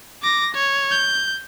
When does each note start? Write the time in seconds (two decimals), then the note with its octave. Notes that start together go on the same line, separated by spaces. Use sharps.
0.22 D6 A#6
0.55 C#5
0.91 G6